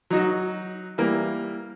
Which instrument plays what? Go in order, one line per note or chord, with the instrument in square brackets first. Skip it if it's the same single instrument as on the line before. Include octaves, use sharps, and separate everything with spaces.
[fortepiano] F#3 D#4 F#4
E3 G3 A#3